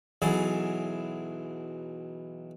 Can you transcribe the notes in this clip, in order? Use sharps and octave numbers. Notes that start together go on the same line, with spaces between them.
B1 E3 F#3 G#4 A5